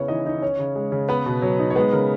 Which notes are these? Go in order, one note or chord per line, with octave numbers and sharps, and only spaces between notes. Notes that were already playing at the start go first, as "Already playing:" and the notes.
Already playing: C#3 B3 C#4 E4 C#5 E5
E3 D#4 D#5
D#4
C#4 C#5
C#3
G#3
C#3
B3 B4
B2
F#3
D#4
C#5
G#3 B3 B4
C#3 A#4